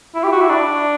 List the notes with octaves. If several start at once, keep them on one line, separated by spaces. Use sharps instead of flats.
E4
G4
F#4
E4
D4